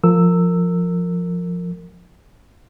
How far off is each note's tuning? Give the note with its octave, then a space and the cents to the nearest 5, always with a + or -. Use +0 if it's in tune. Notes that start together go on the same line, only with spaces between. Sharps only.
F3 +0 A#4 -30 E6 +0